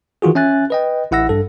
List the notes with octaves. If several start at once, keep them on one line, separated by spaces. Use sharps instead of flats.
D#3 E3 F4 F#4 G#4
C#4 E5 G#5 F#6 A6
B4 D#5 G5
A1 E4 F#5 E6 A#6
G2 A4